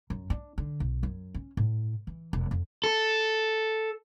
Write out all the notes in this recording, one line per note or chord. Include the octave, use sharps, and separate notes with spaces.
F#2
D4
D3
B1
F#2
C#4
A2
E3
E1
F2
A4